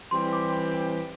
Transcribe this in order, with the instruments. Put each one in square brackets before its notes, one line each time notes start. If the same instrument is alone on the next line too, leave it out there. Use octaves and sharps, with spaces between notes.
[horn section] E3 G3 C4 G4 [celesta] C6
[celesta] D6